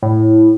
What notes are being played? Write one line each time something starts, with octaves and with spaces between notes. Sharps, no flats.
A2